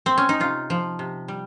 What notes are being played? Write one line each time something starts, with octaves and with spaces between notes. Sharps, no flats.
C4
C#4
D#4
C3 F4
F3
C3
G3